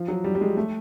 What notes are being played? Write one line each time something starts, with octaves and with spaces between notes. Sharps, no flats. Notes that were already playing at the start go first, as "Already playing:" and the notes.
Already playing: F3
F#3
G3
G3
G#3
A3